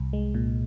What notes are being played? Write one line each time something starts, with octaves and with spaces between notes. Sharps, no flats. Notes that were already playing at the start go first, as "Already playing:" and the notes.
Already playing: C2
G#3
A#2